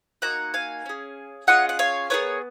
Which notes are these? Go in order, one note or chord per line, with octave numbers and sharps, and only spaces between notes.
A#3 D#4 F#4 F#5 A#5
F5 G#5
C#4 G#4
C#4 F4 G#4 D#5 F#5
F#5
C#5 F5
B3 D#4 G#4 A#4 C#5